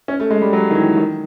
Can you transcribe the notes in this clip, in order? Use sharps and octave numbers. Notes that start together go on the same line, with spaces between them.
C#4
A3
G#3
G3
F#3
D#3
E3
D#3